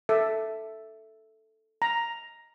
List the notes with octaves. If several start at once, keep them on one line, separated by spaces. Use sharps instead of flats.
A4 E5
A#5